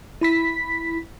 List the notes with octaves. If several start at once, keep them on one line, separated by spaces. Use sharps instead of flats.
E4 B5 B6